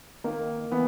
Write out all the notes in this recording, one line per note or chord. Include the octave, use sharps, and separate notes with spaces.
D#3 A#3
E3 B3